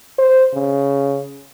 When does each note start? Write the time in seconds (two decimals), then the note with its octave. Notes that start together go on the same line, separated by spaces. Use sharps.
0.18 C5
0.54 C#3